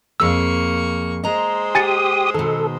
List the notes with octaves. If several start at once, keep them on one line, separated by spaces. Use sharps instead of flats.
F2 A#3 G#4 C#6 E6
G#3 C5 D#5 A#5
G4 G#5 D#6 A6 C#7
B2 D#3 A4